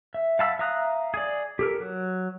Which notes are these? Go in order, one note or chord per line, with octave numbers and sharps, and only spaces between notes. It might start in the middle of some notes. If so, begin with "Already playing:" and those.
E5
F5 F#5 A5 B5 E6
E5 F5 A#5 D#6 F#6
G#4 D5
G4 A4 A#4
F#3